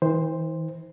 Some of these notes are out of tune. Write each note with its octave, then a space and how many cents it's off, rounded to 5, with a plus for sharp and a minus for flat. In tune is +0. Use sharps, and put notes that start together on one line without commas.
E3 -45 C5 +0